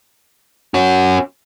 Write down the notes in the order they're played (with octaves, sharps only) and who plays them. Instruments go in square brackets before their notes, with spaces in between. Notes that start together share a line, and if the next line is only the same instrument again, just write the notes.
[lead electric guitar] C#4 F#4